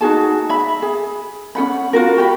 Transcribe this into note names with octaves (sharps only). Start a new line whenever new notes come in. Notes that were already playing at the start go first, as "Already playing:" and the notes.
D#4 F#4 G#4 A5
E5 B5
G#4
C#4 G#4 F#5 B5
F4 F#4 A#4
F#4 G4 F#5 B5